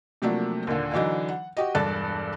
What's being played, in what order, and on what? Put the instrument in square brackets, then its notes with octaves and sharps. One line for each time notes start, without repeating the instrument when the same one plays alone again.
[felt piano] C3 F3 F#3 A3 A#3 D4
D#2 A#2 D3
D3 E3 F#3 D#4
F#5
F#4 G4 D#5
E1 G2 A4 D5 F#6 A6